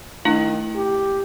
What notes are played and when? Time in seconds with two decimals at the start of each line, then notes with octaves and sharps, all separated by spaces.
0.25 D#3 A3 D4 E4
0.75 G4